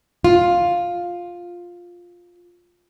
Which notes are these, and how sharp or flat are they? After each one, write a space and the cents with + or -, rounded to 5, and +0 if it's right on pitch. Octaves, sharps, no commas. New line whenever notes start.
F4 +5